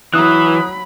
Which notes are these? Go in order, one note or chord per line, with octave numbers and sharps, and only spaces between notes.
E3 F#3 B5 D#6 F#6